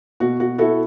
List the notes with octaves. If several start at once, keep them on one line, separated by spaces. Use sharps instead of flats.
B2 F#4
F#4
E4 F#4 A4